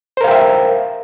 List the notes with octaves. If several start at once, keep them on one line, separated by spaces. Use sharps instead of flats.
A#4 C5 E5 F5 G5